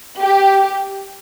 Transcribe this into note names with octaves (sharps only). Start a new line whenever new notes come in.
G4